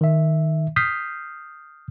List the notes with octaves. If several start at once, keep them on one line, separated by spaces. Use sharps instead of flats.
D#3 E5
D#6 F6 G6 B6 C7